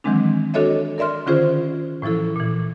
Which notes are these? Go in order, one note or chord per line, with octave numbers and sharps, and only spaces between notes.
D#3 E3 F#3 G#3 C4 D4
D4 F#4 A4 C#5 D#5 E5
A#4 D5 E5 C6 F6
D3 D#3 C#4 F4 G#4 C5
A2 E3 F3 E4 A4
A#2 E3